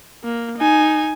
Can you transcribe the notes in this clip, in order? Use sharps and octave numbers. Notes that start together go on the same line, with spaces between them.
A#3
D#4 G#5